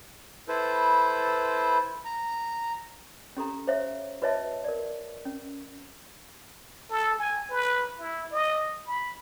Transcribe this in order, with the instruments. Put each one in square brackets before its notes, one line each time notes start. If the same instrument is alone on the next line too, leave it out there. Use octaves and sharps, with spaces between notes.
[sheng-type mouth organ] E4 A4 B4 C5
A#5
[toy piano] C#4 G4 A4 A#5
C5 C#5 E5 F5
F#4 B4 C#5 D#5 E5 A5
A#4 D5
C#4
[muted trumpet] A4
G#5
B4
E4
D#5
B5